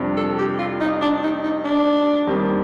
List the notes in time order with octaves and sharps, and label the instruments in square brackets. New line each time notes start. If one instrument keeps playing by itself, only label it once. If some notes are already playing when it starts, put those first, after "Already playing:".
Already playing: [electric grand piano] F2 C3 G3 D4
[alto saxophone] A4
G4
F4
D#4
D4
D#4
D#4
D4
[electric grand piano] D#2 D#3 G3 C4